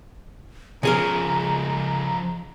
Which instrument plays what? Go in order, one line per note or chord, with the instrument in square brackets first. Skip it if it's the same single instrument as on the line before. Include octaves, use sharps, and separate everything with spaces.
[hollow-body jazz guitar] C#3 G#4 A#4 [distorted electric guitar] F3 C#4 [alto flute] A#5